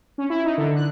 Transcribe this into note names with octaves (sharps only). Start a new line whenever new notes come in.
C#4
E4
D#4
D3
F#6